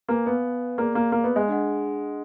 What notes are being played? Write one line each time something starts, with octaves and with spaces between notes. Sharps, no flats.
A#3 B4 F5 G#5
B3
A#3 G#4 D5 F5
A#3
A#3
B3
G#3
D4 G#4 D#5 F#5